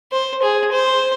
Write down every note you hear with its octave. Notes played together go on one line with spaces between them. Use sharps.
C5
G#4
C5